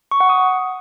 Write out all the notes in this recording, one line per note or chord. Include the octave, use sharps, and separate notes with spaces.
C#6
F#5
D#6